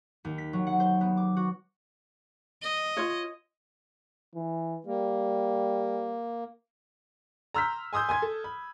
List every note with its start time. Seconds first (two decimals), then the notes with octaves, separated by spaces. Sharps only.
0.25 D#2
0.38 B6
0.53 F#3
0.67 F#5
0.80 C5
1.01 B3
1.17 D6
1.36 F#4
2.63 D#5
2.97 F4 C#5
4.35 E3
4.86 G3 A#3
7.54 A#5 C6 E6 F6 G6 B6
7.93 G#5 C6 D#6 E6 G6
8.09 G#5 C6 G#6
8.22 A4
8.44 B5